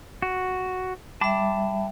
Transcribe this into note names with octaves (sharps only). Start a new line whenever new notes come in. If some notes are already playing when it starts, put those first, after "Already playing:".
F#4
G3 E5 A5 B5 D6